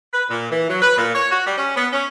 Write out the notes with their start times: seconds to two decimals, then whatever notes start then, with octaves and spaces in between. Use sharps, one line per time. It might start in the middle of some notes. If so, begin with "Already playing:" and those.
0.13 B4
0.29 A#2
0.51 E3
0.68 F#3
0.82 B4
0.97 A#2
1.15 C#5
1.31 F#4
1.46 G3
1.58 C#4
1.76 B3
1.93 C#4